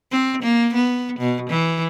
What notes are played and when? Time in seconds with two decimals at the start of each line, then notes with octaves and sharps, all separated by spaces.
0.12 C4
0.43 A#3
0.74 B3
1.19 B2
1.50 E3